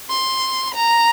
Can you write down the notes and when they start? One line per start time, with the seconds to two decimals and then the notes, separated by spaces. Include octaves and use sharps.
0.10 C6
0.74 A#5